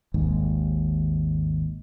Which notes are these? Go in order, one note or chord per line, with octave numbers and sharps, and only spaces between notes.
G#1 D#2 G#2